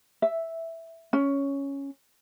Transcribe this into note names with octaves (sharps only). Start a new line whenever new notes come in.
E5
C#4